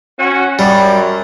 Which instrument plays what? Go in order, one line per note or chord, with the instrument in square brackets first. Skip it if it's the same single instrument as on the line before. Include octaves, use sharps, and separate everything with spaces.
[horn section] C#4 F#4
[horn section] F#2 [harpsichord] G3